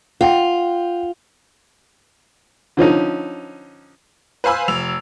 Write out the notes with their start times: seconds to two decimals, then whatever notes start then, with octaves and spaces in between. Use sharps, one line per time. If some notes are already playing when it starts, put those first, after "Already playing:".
0.21 F4 F#5 G5
2.77 D3 F3 C#4 D#4
4.44 B4 C5 F5 G#5 B5 E6
4.68 F1 E6 F7